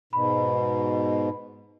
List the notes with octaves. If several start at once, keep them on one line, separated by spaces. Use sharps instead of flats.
G#2 B2 B5